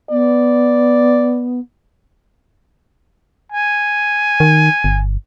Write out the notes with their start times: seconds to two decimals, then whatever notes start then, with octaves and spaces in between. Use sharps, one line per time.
0.10 B3 D5
3.52 G#5
4.40 D#3
4.84 G1